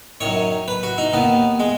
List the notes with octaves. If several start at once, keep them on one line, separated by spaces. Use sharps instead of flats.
F#2 D#3 C#5
B4
F#4
D#4
D#2 D#3 B3
G#3